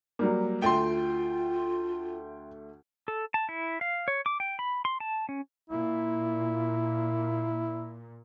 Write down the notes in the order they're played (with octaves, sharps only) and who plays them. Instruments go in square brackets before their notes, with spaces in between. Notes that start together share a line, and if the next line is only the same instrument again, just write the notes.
[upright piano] F#3 G3 A#3
[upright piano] D2 A3 [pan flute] F4 [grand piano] G5 C6
[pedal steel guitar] A4
A5
E4
F5
C#5
D6
G5
B5
C6
A5
C#4
[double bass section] A#2 [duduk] E4